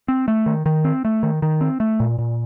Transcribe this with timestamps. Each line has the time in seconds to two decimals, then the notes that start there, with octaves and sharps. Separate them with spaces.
0.08 C4
0.28 A3
0.46 D#3
0.66 D#3
0.84 C4
1.05 A3
1.23 D#3
1.42 D#3
1.61 C4
1.80 A3
2.00 A#2
2.19 A#2